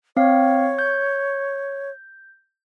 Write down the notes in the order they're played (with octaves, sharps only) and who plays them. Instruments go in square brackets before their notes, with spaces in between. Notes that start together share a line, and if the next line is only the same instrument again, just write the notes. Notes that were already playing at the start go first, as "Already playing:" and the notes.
[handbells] C4 F5 [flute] C#5
[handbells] G6